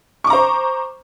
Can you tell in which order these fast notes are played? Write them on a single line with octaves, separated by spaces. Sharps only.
C#6 D6 A#5 C5